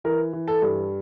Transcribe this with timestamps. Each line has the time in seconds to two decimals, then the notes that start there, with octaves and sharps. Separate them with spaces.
0.04 E3 A#4
0.33 E3
0.48 A4
0.62 G2